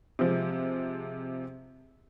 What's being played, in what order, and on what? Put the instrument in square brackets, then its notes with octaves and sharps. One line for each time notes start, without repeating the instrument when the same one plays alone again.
[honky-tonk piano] C3 F3 G#3